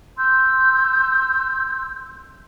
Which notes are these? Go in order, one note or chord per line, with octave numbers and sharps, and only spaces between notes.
C6 E6 G6